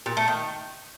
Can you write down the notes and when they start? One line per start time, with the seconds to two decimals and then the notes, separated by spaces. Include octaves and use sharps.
0.06 A#2
0.17 A3
0.28 D#3